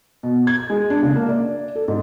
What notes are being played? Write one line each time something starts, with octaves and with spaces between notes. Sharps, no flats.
B2
G#6
G#3
D4
C#3
A#3
D5
A4
G#2